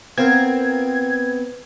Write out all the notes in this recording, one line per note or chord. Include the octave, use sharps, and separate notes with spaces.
B3 C4 F4 A#4 G#6